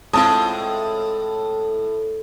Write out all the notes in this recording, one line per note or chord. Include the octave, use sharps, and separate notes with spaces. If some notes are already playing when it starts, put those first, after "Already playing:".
A2 G#3 C4 F4 A5 D#6